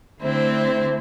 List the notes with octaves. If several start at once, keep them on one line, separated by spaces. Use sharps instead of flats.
D3 A3 C4 E4 C5